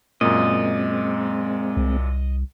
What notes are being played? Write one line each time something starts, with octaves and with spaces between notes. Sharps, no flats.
F#2 A#2 G#3 C4 D#5
C2